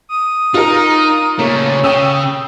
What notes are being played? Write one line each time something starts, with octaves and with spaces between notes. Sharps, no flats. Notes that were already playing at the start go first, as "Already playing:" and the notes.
D#6
D#4 F4 A#4
C#3 A3 A#3 C#5
C#3 G5 D#6 E6